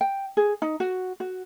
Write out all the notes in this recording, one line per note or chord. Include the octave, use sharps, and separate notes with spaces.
G5
G#4
D#4
F#4
F#4